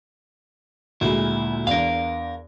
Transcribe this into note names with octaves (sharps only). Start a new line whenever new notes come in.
D2 A#2 G#3 E4
E2 D4 A#4 F5